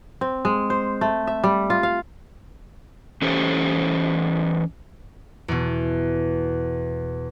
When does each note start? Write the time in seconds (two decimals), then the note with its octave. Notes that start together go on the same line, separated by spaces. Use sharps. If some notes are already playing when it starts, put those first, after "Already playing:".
0.21 C4
0.45 G#3
0.70 C5
1.01 A3
1.27 E5
1.44 G3
1.70 F4
1.83 F5
3.22 E3 C#4 G4 A4 C5
5.48 E2 B2